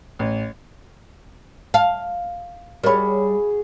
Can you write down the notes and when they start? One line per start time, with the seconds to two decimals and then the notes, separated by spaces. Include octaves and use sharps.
0.19 A1
1.74 F5 A5
2.84 G3 F#4 G#4 A#4 C#5 E5 B5